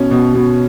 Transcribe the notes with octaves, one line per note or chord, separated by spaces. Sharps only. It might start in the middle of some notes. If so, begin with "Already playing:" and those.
Already playing: B2 C#4
B2
B2